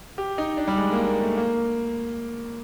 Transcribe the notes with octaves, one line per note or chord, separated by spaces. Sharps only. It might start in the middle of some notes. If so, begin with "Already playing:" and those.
G4
D#4
D4
G3
G#3
A#3
A#3
A3
A#3